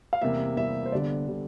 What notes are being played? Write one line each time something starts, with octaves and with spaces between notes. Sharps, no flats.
F5
E2 C3 G3 A#3 E5
E2 C3 G3 A#3 E5
C5
G1 G2 D3 G3 D5
D3 G3